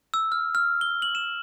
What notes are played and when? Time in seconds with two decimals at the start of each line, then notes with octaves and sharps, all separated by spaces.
0.14 E6
0.32 F6
0.55 F6
0.81 G7
1.02 F#7
1.15 E7